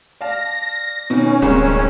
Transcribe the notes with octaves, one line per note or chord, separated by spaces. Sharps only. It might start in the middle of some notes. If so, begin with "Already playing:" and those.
D5 F5 A5 A#6
B2 D#3 C#4
D1 C2 G#3 A#3 C4